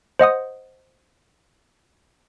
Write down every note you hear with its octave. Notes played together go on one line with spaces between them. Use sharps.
C5 D#5 F#5 D#6